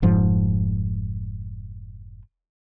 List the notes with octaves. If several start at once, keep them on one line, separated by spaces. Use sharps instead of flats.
F1 G#2 F3